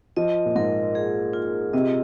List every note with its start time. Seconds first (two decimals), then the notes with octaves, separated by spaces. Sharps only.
0.16 F3 D#5
0.46 A#2
0.55 G#2 A#4
0.95 G#4
1.33 F4
1.73 C3 D#5